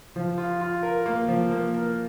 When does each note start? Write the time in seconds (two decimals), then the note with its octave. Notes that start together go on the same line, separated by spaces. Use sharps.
0.16 F3
0.38 F4
0.61 F4
0.83 A#4
1.06 A#3
1.28 F3
1.51 A#3
1.73 A#4